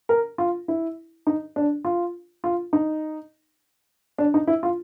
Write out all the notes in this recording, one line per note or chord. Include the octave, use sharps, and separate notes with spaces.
A#4
F4
E4
D#4
D4
F4
F4
D#4
D4
D#4
E4
F4